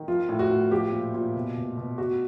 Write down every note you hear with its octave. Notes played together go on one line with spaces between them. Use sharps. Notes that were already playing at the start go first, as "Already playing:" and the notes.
Already playing: D#3
F3 F4
A2
F#4
A2
F3 G4
A#2
A#2
B2
B2
B2
B2 F#4